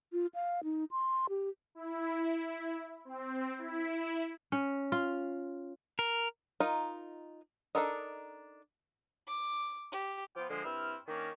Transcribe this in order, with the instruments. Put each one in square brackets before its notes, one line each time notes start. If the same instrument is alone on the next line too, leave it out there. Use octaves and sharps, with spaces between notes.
[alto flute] F4
F5
D#4
C6
G4
[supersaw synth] E4
C4
E4
[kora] C#4
F4
[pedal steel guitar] A#4
[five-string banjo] D#4 F4 A#4 D#5
D4 D#4 A4 A#4 D#5
[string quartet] D6
G4
[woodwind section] F3 B3 F4 G5 D6
D3 F3 G#3 A#3 C5
G2 C4 E4 F6
D#3 A#3 C#4 D4 A#5